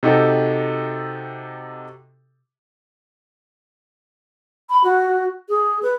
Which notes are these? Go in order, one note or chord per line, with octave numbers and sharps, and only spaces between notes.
C3 D#4 F#4 G4 A4
B5
F#4
G#4
B4